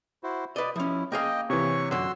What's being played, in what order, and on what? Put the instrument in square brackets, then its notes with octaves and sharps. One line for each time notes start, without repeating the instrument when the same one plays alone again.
[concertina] E4 F#4 C5
[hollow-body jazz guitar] B4 D#5 [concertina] D5
[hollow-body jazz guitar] F3 C#4 [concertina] E4
[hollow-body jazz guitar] A#3 G#4 F5 [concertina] D#5 G5
[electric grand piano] C3 E3 [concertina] C#5 C#6
[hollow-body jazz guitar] F#2 D3 [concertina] F#4 C6 E6